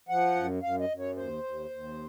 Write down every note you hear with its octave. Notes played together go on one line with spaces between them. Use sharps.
F3 F#5
F#2
F#2 F5
D#5
F#2
C#5
D#2 C5
D#2
D#2